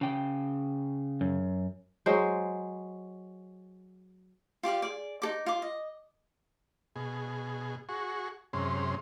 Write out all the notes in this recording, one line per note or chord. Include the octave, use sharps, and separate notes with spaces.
C#3 G5
F#2
F#3 G#3 C5
F4 G4 D5 F5
G#4 D5
D#4 A4 D6
F4 D6
D#5
B2 G#4
F#4 G#4 C#6
F#2 C3 G#3 C#4 C6